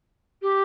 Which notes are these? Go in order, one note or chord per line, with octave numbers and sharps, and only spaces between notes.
G4